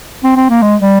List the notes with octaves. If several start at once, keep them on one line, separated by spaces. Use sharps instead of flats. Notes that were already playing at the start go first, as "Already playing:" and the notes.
C4
C4
A#3
G#3
G3